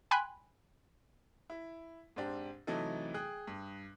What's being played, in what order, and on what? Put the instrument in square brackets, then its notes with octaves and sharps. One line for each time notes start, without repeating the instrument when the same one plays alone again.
[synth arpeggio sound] G5 G#5 B5 C6 F#6
[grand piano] E4
G#2 C4 D4 G4
C3 E3 F#3 A3 D#4 A4
G#4 G5 D#6 F#6
G2